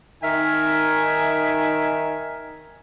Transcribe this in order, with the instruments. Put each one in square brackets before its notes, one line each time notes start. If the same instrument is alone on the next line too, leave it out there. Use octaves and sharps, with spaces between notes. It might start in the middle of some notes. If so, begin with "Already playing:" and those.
[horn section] D#3 D#4 A#4 E5 G#5